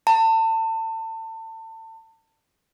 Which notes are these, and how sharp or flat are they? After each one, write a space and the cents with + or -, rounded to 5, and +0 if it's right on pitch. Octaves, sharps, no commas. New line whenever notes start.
A5 +30